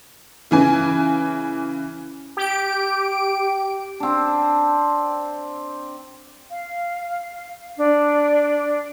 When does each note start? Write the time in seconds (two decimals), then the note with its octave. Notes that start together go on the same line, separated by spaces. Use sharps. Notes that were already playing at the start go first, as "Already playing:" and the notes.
0.51 C#3 E3 G#5
2.37 G4 D7
4.00 C4 D4
6.50 F5
7.77 D4